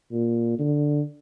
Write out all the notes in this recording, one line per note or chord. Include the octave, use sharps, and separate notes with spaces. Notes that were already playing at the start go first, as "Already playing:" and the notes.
A#2
D3